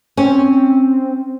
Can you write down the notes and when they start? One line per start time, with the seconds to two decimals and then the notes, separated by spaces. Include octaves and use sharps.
0.17 C4 C#4